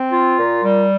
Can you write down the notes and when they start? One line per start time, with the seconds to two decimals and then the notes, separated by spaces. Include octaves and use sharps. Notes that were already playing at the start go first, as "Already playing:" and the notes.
Already playing: C4
0.12 F4
0.38 A#2
0.63 G3